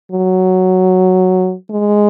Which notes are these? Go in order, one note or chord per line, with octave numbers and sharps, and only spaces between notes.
F#3
G#3